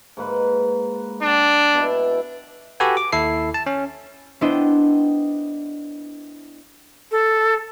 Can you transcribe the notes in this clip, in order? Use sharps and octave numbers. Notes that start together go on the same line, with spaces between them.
G#2 A#3 B4
D4 G5 A5
B2 E4
F#4 G4 A4 B4 G#5
D6
D#2 E4 A4 C7
A5
C#4
B3 D4 E4 C5 D#5 G5
A4